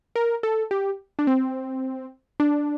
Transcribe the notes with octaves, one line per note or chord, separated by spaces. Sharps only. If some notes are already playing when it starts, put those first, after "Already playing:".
A#4
A4
G4
D4
C4
D4